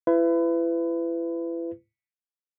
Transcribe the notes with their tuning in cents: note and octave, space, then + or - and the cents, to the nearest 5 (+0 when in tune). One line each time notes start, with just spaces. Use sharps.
E4 +30 B4 +30